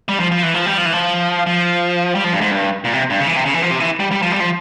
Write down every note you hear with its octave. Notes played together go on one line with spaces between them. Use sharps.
G3
F3
F3
E3
F3
G3
F3
E3
F3
F3
G3
F3
G2
G#2
G2
A#2
C3
G2
C#3
E3
C3
C#3
E3
F3
C3
E3
G3
G3
F3
G3
F3